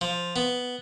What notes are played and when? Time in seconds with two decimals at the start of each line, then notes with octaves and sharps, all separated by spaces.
0.01 F3
0.36 B3